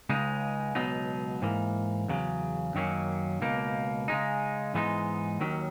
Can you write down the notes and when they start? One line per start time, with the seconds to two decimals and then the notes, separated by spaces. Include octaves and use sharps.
0.09 C#2 C#3 G#3 D#4
0.75 C#2 B2 F#3 B3 D#4
1.42 G#2 E3 A#3
2.08 E2 C#3 F#3
2.75 F#2 D#3 F#3 A#3 C#4
3.41 C#2 B2 A#3 D#4
4.08 C#3 G#3 D#4
4.74 G#2 E3 G#3 B3 D#4
5.40 D#2 D#3 F#3 C#4